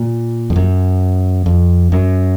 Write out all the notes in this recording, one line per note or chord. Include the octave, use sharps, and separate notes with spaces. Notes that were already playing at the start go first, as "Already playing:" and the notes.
Already playing: A#2
F2
F#2
F2
F#2